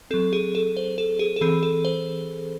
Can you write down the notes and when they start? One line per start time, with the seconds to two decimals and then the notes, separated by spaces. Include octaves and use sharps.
0.11 F#3 C4 A4
0.33 G#4
0.55 A4
0.77 C5
0.98 A4
1.19 G#4
1.36 A4
1.41 E3 C4 G#4
1.63 A4
1.85 C5